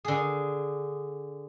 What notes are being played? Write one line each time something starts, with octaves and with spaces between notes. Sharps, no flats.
D3 G#4